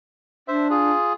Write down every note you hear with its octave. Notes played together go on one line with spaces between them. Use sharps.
D4 C5 E5
F4 G#4